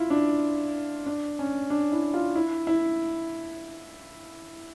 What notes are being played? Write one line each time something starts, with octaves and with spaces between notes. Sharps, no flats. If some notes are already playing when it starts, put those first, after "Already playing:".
Already playing: E4 F4
D4
D4
C#4
D4
E4
F4
E4
E4